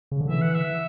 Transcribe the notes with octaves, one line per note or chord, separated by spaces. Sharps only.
C#3
D3
E3 E5
F#5
E5